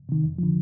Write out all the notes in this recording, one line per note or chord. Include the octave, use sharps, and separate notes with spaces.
C3 D#3
F2
D3 F3